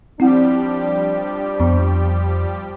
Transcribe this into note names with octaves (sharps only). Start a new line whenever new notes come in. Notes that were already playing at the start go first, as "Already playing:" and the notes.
F3 G3 C4 D4 E4 G4 F#5
F2 B3